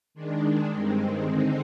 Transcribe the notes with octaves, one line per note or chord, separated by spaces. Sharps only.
D#3 G#3 D4
G2 D#3 G#3 C4
D3 G#3 C4 D#4